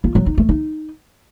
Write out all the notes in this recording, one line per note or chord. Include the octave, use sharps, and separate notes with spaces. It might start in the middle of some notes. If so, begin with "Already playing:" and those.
F4
F#3
D#4
A3
D#4